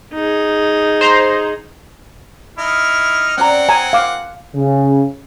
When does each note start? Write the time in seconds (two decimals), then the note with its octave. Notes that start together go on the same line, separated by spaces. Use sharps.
0.14 D#4 G#4
1.01 C5 A#5 C6
2.58 D#4 E4 F6
3.38 C4 C#4 D5 F#5 A#5
3.69 G#5 A#5
3.93 F5 D6
4.55 C#3